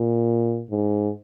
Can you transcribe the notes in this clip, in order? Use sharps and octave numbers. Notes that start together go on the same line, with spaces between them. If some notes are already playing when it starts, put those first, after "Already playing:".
Already playing: A#2
G#2